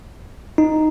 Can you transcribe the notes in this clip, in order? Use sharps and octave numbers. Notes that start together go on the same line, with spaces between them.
D#4